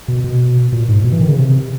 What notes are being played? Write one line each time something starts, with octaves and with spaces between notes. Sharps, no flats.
B2
B2
A#2
G#2
B2
E3
D#3
C#3
C3